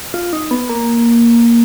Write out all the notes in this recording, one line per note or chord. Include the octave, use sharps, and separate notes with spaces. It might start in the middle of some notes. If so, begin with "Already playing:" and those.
F4
D#4
B3
A#3